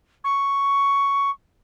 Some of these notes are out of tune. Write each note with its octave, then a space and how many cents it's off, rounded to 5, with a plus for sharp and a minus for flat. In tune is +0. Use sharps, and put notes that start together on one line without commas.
C#6 +5